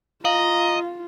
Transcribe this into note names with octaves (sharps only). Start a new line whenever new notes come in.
F4 D#5 F5 A#5